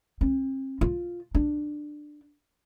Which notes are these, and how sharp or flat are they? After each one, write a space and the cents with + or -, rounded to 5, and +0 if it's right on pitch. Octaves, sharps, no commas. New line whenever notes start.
C4 +40
F4 +0
D4 +15